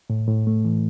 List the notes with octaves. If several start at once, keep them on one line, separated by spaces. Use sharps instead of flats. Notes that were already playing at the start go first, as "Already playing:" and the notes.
A2
A2
A3
E3